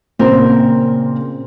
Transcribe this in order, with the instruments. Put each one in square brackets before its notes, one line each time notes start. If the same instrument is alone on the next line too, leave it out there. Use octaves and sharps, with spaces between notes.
[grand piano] A#2 C#3 A#3 [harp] C4 A#4